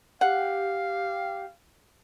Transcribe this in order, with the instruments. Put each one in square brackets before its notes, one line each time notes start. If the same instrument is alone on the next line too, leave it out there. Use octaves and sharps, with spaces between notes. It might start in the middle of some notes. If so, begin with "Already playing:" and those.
[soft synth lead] G4 [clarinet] F5 [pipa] F#5